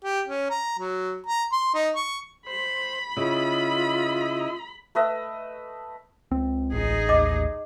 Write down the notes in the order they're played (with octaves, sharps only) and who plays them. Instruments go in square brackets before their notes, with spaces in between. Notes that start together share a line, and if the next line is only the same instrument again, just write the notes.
[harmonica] G4
C#4
A#5
F#3
A#5
C6
D#4
C#6
[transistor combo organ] C5 [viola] B5
[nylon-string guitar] C#3 [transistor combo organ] E4 D#5 [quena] F4
[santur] A3 B4 D#5 E5
[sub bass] C#2 [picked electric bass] C4
[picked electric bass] A1 [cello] D#4 G#4
[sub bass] D#2 [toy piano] D#5 D6